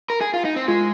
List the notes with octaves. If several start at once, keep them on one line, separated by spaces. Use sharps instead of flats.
A#4
G#4
F4
D#4
C4
G#3 F4